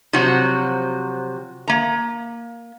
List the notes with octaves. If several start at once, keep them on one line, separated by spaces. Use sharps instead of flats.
C3 F3 F#3 F#4
A#3 A#5